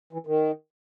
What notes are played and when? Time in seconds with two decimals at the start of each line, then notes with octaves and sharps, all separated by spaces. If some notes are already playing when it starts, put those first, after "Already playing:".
0.13 E3
0.27 D#3